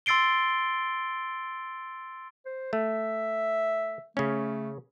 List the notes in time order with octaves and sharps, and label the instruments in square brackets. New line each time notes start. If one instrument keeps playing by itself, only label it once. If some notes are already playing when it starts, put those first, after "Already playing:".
[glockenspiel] C6 E6 A6 C7 D7 G7
[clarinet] C5
[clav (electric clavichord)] A3 [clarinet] E5
[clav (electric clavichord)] C#3 C#4 [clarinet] A3